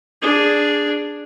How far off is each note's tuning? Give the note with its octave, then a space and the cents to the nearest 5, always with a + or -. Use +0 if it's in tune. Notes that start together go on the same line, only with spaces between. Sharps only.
D4 +0 G#4 -5